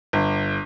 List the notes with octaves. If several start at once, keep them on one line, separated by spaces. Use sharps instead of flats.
G1